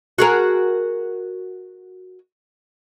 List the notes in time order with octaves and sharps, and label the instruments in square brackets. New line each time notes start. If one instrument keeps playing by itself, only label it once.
[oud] F#4 G#4 A#4